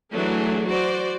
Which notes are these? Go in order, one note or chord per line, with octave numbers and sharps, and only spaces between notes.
E3 F#3 A3 D4 G#4
F#4 C5 D5